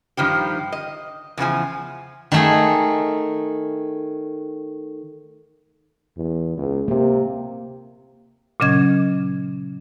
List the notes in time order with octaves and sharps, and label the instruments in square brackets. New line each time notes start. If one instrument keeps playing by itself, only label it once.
[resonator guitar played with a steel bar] G2 D#3 F3 G4
D#5
E2 C#3 F3 G#5
[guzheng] D#3 A3 G#4
[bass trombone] E2
C#2
[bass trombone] C3 [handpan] A#3 C4
[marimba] A#2 C#3 F#3 C#4 D#5 G#6